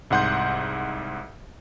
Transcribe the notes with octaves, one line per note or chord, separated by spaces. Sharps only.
C2 G#2 F#5 C6 G6